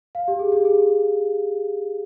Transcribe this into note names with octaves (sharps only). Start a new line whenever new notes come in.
F5
G4
G#4
G4
G#4